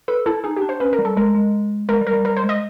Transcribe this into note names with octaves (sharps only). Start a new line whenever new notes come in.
A4 B4
E4 A4
D#4 G#4
G4
D4
C5
C#4 B4
A#4
G3
A4
G#3 A#4
G#3
G#3 A#4
G3
A#4
G3
G3 A#4
C5
G#3
D#5